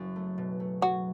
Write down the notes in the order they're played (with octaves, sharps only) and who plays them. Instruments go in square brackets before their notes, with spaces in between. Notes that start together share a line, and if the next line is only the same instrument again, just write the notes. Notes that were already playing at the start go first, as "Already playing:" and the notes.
Already playing: [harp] F#1 F#2 F#3
A3
B2
A3
[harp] F#3 [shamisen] F#4